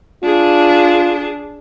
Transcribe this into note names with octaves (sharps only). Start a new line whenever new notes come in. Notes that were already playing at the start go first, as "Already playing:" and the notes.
D4 F4 G#4